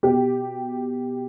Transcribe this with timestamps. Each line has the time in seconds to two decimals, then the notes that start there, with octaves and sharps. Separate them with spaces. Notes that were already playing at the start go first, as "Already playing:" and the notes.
0.03 B2 G4